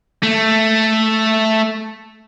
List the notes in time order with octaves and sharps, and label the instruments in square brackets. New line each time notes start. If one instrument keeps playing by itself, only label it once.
[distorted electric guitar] A3